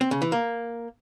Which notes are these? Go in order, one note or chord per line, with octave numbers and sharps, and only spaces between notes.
C4
C#3
E3
A#3